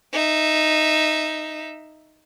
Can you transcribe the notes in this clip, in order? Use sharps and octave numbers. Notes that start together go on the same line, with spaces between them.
D#4 E5